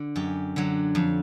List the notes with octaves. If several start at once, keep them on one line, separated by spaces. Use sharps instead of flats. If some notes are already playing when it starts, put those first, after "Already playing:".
Already playing: D3
F#2 G4
D3 F#3
F2